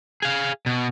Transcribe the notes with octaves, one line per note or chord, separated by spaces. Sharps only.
G#4 F5
B2